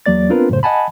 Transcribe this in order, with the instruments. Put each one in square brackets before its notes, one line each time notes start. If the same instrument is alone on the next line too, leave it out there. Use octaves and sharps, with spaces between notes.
[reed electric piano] E2 F#3 A#3 D5 A6
B3 C4 D4 F4 A#4 B4
F#2 A2 C#3 C5
D#5 F#5 G#5 A5 B5